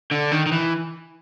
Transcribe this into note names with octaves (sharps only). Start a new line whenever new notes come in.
D3
D#3
D#3
E3